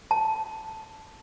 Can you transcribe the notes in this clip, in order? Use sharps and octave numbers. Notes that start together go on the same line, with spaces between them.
A5